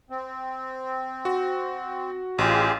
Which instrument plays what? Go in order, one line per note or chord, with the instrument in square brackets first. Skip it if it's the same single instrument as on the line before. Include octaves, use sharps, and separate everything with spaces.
[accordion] C4
[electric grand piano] F#4
[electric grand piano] A1 [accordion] F4 G4 G#4